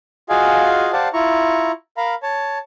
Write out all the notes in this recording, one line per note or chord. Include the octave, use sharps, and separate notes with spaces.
F4 F#4 G#4 D#5 F5 G#5
G4 C5 D5 F5 F#5 A5
E4 F4 A#5 C#6
A#4 F5 A#5 B5
C#5 A5